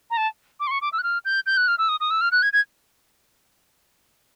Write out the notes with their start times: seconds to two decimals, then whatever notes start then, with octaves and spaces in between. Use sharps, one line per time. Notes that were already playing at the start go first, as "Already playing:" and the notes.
0.10 A#5
0.17 A5
0.60 D6
0.67 C6
0.71 C#6
0.82 D6
0.93 E6
0.99 F#6
1.03 F6
1.25 G6
1.46 G6
1.57 F#6
1.68 F6
1.78 E6
1.89 D#6
2.00 D#6
2.11 E6
2.21 F6
2.32 F#6
2.42 G#6
2.53 G#6